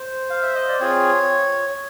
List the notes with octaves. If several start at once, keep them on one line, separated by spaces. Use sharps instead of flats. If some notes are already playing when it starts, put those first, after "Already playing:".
Already playing: C5
F5
E5
D#5
D5
C4 F4 G#4 C#5